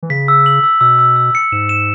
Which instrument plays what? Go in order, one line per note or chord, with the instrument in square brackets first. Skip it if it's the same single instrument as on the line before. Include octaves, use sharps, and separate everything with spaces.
[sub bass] E3
[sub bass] C#3 [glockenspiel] B6
[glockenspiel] E6
F#7
E6
[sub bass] B2 [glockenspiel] E6
[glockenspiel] E6
E6
C#7
[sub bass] G#2 [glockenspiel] E7
[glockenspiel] E7